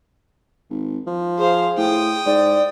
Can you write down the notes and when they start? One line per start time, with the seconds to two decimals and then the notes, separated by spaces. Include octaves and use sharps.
0.70 G#1
1.07 F3
1.38 G#4 C5 F5
1.77 A2 G5 D#6
2.26 G#2 D5